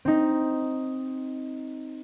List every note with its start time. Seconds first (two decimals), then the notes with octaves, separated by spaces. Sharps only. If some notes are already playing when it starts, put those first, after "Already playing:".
0.05 C4 D#4